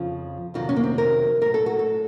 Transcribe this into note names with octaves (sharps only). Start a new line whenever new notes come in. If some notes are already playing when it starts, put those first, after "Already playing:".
Already playing: F2 C#3 F3 F4
F2 C3 D#3 F#3 F4
C#4
A#3
C4
A#4
A2 F#3 A#4
A4
F#4
A4